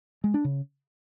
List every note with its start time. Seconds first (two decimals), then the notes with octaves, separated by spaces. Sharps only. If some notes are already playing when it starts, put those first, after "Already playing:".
0.24 G#3
0.34 D4
0.44 C#3